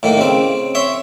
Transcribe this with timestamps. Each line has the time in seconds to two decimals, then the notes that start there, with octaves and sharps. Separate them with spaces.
0.03 A2 D#3 A#3
0.18 C#3 C4
0.75 C#5 E5 C6